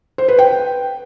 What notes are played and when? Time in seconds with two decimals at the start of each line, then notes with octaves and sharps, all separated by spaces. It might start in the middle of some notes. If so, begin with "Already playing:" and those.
0.18 C5
0.28 B4
0.39 G5